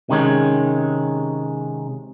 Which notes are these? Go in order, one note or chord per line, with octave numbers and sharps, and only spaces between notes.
C3 D#3 G#3 C#4